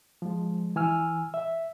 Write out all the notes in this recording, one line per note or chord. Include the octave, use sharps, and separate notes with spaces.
F3 G#3
E3 G#5 E6 F6
E5